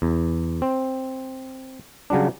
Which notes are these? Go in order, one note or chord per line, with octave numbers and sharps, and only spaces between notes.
E2
C4
C#3 F#3 G3 D4